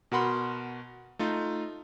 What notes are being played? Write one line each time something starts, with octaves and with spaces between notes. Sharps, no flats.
B2 F#4 A#4 F#5 B5 C6
A3 D#4 F4